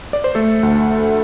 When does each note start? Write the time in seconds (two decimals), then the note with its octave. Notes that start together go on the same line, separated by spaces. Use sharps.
0.13 D5
0.24 C5
0.35 A3 A4
0.63 D2